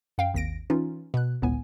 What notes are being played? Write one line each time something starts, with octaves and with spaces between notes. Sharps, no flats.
F#2 F5 G5
G#1 D#2 A#6 D7
E3 C#4 D#4 F4
B2 F#6
G1 C#2 A2 B3 G#5